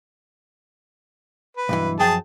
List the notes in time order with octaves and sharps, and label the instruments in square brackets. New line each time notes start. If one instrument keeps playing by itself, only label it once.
[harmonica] B4
[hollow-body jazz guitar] B1 G2 E3
[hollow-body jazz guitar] F#2 F3 G5 [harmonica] G#4 A5